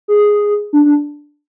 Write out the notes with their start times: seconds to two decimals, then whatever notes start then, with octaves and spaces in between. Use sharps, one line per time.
0.08 G#4
0.73 D4
0.85 D4